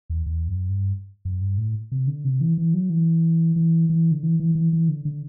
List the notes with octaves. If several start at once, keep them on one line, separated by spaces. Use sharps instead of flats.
E2
E2
F#2
G2
F#2
G2
A2
C3
D3
C3
E3
E3
F#3
E3
E3
E3
D3
E3
E3
E3
E3
D3
D3